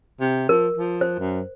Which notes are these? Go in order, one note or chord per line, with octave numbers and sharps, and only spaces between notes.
C3
F3 A#4
F3
C5
F#2